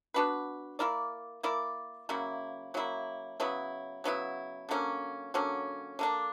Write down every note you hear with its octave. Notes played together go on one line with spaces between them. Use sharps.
B3 D4 F#4 B4
A#3 E4 A#4 D5
A#3 E4 A#4 D5
C#3 F#3 A#3 E4
C#3 F#3 A#3 E4
C#3 F#3 B3 E4
C#3 F#3 B3 E4
D3 F#3 A#3 C#4
D3 F#3 A#3 C#4
D3 A#3 D4